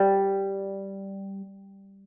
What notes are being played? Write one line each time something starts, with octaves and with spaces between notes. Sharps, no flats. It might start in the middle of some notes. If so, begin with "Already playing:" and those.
Already playing: G3